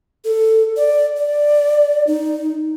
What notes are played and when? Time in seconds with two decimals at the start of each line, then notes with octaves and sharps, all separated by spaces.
0.24 A4
0.77 D5
1.16 D5
2.07 D#4